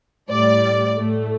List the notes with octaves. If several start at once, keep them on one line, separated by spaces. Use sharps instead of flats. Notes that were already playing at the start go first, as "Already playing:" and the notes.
A2 G3 D5
A2 A3